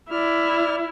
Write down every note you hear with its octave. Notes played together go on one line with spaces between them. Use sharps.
E4 D5 F6